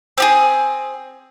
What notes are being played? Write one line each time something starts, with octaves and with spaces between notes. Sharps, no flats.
C4 G4 G#4